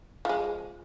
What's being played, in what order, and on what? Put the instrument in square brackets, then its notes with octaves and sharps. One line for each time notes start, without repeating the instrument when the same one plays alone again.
[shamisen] F3 G#3